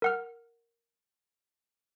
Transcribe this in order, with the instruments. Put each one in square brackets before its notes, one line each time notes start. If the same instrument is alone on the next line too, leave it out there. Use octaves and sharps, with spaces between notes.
[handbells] A#4 F#5 F6